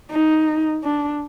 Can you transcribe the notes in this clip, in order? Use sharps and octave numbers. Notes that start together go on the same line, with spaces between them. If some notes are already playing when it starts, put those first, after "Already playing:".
D#4
D4